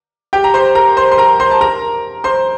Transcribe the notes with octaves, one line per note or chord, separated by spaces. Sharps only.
G4 G5
A#5
C5 C6
A#4 A#5
C5 C6
C6
A#4 A#5
C5 C6
A5
A#4 A#5
C5 C6